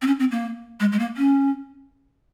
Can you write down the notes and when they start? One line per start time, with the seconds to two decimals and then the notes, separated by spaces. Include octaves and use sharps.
0.02 C4
0.07 C#4
0.19 C4
0.31 A#3
0.80 G#3
0.92 G#3
0.99 A#3
1.17 C#4